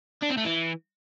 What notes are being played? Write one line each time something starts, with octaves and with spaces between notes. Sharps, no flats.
D4
C4
A3
E3